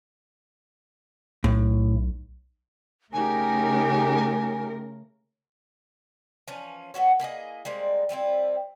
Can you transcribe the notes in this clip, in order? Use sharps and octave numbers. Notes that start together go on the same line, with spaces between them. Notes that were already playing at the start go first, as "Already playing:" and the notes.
B1 A2
C#3 A3 D#4 G4 A#4 G#5
E3 F3 C#4
F#3 B3 F#4 C#5
A#3 E4 G#4 D#5
G3 G#3 A#3 C4
F3 G3 C4 E4